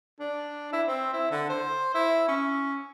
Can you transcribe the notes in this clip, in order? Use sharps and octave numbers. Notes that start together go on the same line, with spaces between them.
D4
E4
C4
E4
D3
C5
E4
C#4